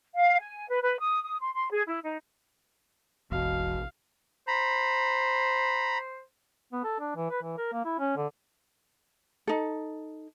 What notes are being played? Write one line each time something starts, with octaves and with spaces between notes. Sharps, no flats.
F5
G#5
B4
B4
D#6
D#6
C6
C6
G#4
E4
D#4
E1 A1 B2 F5
C5 A#5 B5
B3
A4
D4
E3
B4
E3
A#4
A#3
E4
C#4
D3
D#4 A4